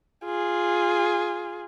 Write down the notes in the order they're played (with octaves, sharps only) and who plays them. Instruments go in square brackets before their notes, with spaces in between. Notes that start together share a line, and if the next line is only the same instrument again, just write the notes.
[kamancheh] F4 G#4